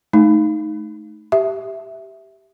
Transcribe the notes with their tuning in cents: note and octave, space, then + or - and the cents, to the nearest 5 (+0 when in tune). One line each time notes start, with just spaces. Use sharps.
A3 -25 D#4 +0
G4 -10 E5 +0